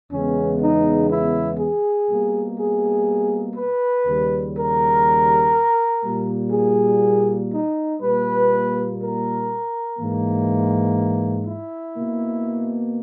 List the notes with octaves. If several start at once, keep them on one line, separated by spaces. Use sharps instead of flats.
E2 C#3 G#3 B3 C#4
D#4
E4
G#4
B2 G3 A#3
G#4
B4
D#2 C#3 G3
A#4
A#2 G3 A#3
G#4
D#4
A#2 G3 A#3 B4
A#4
G#2 E3 A#3
E4
B2 A#3